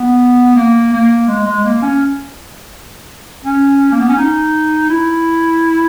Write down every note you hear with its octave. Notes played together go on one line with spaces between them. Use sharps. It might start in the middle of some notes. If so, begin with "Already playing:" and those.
Already playing: B3
A#3
A#3
G#3
G#3
A#3
C#4
C#4
A#3
B3
C#4
D#4
E4